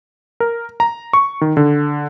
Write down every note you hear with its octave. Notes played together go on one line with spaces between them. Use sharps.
A#4
A#5
C#6
D#3
D3